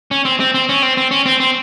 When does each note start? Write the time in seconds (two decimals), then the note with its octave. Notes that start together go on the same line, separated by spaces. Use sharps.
0.11 C#4
0.25 C4
0.40 C4
0.54 C4
0.69 C#4
0.82 C4
0.97 C4
1.11 C#4
1.26 C4
1.40 C4